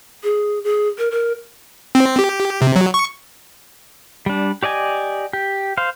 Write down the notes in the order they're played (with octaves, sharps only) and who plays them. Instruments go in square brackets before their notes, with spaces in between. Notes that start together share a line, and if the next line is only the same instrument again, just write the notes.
[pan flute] G#4
G#4
A#4
A#4
[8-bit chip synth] C4
G4
C3
F#3
C#6
[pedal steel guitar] G3 D4
G4 D5 D#5 G#5
G4
C5 F5